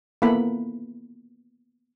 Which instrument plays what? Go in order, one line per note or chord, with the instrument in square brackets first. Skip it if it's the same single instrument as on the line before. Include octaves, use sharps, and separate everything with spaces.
[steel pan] A#3 B3 E4 A4 B5